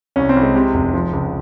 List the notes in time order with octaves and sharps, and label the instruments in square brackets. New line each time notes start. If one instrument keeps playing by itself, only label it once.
[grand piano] C2 C#4
C4
C2
G#3
C3
F1
F3
C#2